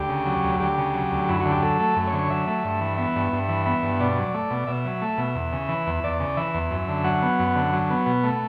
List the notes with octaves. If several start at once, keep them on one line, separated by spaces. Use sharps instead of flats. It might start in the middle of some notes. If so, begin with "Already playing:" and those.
Already playing: D2 G4
C#3
F#3
D2
D2 G4
C#3
F#3
D2
F#2 E4
D3 F#4
G4
F#3 A4
A3
F#2
C#5
D3
C#5
F#3 E5
A3
G2
E3
B3 E5
G2
G2
E3
B3 E5
G2
B2 D5
F#3
A3
B2
B2 E5
F#3
A3
B2
E2
C#3
E3
E2
E2 D5
C#3
E3 E5
E2
F#2
D3
F#3 F#5
B3
F#2
D3
F#3
B3
B2
A3